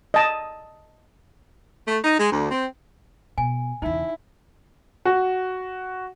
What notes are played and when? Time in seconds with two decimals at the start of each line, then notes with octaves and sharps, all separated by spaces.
0.14 D#5 A5
1.87 A3
2.04 D#4
2.18 G#3
2.31 D2
2.51 C4
3.38 B2 G#5
3.82 E2 C#3 D#4 E4
5.05 F#4